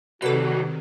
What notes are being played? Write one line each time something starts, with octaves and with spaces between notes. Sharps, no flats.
C3 D#3 F#3 G3 F#4 A4 B4